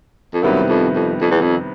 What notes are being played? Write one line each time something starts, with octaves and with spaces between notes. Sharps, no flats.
F2
F#2 C3 D#3 G3 B3 E4
F2
F2
F2
E2
F2